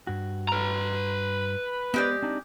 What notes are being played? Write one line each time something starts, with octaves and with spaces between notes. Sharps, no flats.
G2 F#4
B4 A#5
G#3 B3 G4 C5 D5
C4 D4 D#4